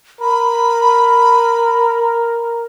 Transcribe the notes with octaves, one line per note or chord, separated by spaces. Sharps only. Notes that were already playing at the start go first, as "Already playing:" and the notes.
A#4 B5